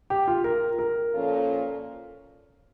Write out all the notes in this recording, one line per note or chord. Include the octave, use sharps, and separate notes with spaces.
G4
F4
A#4
A#4
A#2 F3 C#4 F4 A4